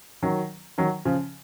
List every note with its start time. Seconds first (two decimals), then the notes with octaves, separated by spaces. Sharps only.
0.23 D#3 F#3
0.78 D#3 F#3
1.05 C#3 F3